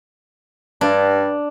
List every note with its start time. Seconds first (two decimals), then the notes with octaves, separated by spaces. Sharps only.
0.81 G2 D4